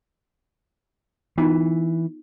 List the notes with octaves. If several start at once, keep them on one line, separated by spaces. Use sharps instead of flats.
E3 B3 D#4 F4